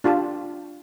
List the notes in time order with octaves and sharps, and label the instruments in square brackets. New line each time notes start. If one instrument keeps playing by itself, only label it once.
[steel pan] D4 F4 G4 A5